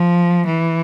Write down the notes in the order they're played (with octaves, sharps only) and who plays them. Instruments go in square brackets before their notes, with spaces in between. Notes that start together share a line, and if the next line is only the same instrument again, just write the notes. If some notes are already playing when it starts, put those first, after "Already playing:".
Already playing: [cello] F3
E3